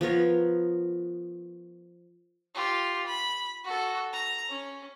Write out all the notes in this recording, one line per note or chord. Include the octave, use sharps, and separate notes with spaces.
F3 B3 A#4 C#5
F4 G4
B5
F#4 A4
A#5
C#4